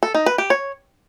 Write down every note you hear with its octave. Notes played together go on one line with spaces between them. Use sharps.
A4
D#4
B4
G4
C#5